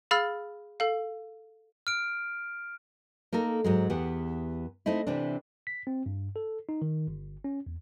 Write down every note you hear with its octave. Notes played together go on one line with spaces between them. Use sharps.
G#4 F5 B5 E6 F6 A6
A4 F5
F6 D7
A#3 D#4 A4 A#4
G#2 F#3 G#3
E2 E3 B3 G4 F#5
A3 C4 D#4 E4
C3 E3 C4 D4
B6
C4
G2
A4
D#4
D#3
G1
C#4
E2